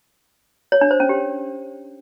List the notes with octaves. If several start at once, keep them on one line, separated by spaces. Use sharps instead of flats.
C#5
D4
C5
C#4
G4